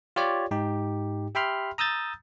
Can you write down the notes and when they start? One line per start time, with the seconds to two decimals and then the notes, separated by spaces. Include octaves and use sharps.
0.16 F4 G4 C#5 D5
0.51 G#2 D#4 G4
1.35 G4 E5 G5 B5 C6 F6
1.78 A#5 D#6 E6 G6 A6